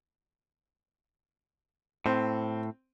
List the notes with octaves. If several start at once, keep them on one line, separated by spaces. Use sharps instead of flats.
A2 C4